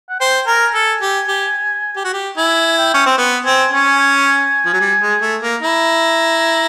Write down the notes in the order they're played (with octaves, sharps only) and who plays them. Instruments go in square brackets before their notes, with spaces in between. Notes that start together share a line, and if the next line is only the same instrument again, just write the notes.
[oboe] F#5
[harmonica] C5 [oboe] G5
[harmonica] A#4 [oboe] G#5
[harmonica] A4
G4
G4
G4
F#4
G4
[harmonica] E4 [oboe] G#5
[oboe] G5
[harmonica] C#4
C4
B3
[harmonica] C4 [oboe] G#5
[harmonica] C#4 [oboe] G#5
[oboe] G#5
[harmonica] F3
F#3
G3
G#3
A3
A#3
[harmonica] E4 [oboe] A#5